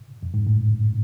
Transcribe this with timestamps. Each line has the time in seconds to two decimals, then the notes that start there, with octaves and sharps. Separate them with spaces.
0.23 F2
0.34 G#2
0.47 A2